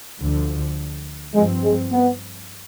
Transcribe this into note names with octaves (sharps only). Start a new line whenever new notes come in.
D2 D3 F3
G2 F3 G#3 C4
G#3
B3